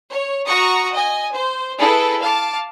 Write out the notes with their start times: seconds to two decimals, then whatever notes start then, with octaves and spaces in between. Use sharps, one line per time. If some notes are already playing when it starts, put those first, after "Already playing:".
0.11 C#5
0.47 F#4 A#5 C#6 D#6 C#7
0.92 D#5 G#5
1.32 C5
1.78 E4 G#4 A4 B4
2.21 F5 A5 D6